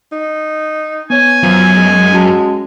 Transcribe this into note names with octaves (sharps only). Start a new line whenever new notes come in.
D#4
B3 C#5 G#5 G#6
F#2 F3
G#3
C#4 F#4 A5